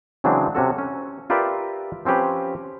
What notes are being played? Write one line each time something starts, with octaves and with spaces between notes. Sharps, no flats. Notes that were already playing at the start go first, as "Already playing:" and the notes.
C#3 E3 F#3 G#3 C4 D4
C3 C#4 F#4 A4
C#4
F4 G4 A#4 B4 D5 E5
F3 C4 C#4 G4 B4